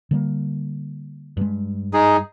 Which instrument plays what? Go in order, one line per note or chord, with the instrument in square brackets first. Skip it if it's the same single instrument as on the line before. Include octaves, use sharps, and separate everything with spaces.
[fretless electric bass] D3 G3 A#3
G2 G#3
[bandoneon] D#4 G#4